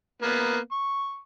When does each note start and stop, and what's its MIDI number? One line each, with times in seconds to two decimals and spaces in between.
0.22 0.58 58
0.22 0.58 59
0.72 1.19 85